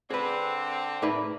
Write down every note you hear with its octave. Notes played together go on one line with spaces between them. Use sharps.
D3 C4 G#4 B4
A2 D#4 G#4 A#4 B4 D5